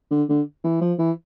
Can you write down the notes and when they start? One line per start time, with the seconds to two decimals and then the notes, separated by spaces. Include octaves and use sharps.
0.11 D3
0.29 D3
0.64 E3
0.81 F3
0.99 E3